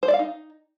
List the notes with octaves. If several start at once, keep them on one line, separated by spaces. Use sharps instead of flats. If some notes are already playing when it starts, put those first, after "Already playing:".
C5
D5
F5
D#4